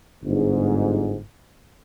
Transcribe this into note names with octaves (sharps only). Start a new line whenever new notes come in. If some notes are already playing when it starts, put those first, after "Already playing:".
G1 G#2